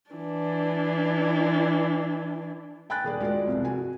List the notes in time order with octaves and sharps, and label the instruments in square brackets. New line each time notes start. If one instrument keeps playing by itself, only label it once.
[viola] E3 D4
[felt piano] G5 G#5 B5 F#6 A6
D#1 G#4 D5
G#3 F4 F#4 A#4 D5
C2 F2
F#4 G#5